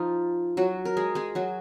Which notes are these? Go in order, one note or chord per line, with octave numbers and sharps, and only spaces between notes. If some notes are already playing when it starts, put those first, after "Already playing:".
Already playing: F3 D#4 F4
F#3 F#4
A#4
G#3 G#4
G#3 G#4
F#3 F#4